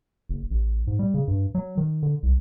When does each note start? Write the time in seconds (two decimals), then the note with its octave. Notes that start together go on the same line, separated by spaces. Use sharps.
0.29 F#1
0.50 A1
0.87 G#2
0.99 G3
1.14 C#3
1.28 G2
1.55 F#3
1.77 D#3
2.02 D3
2.23 C2